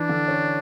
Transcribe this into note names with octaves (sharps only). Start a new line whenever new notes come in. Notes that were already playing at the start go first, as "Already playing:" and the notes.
Already playing: E3 D4
D3
C#4